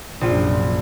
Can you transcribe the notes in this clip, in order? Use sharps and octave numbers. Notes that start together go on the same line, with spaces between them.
A#1 F#2 C3 F4